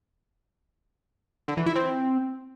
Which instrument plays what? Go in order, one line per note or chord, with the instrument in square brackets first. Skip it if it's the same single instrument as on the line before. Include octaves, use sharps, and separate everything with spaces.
[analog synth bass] D3
E3
E4
C4